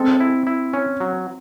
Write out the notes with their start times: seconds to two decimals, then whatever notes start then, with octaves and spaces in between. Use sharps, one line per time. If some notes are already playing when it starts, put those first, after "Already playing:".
Already playing: G#3 C4 A4
0.20 E4
0.47 E4
0.73 C#4
1.00 F#3